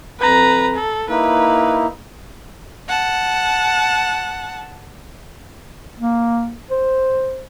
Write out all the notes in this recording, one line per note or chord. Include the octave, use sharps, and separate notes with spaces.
F2 B4 A#5
A4
A#3 D#4 E4 B4
F#5 A5
A#3
C5